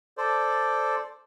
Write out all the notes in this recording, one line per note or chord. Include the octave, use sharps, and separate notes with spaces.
A4 C5 D5